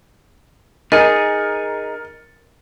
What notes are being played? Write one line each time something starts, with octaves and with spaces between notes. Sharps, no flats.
D#4 G#4 A#4 D#5 A6 C#7 D#7